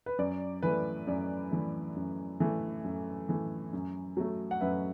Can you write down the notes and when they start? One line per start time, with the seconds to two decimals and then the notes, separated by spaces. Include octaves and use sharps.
0.06 B4
0.18 F#2 D5
0.63 E3 A3 B4
1.07 F#2 D5
1.51 E3 A3
1.96 F#2
2.40 E3 A3
2.84 F#2
3.29 E3 A3
3.73 F#2
4.17 F#3 A3
4.51 F#5
4.61 F#2 B4 E5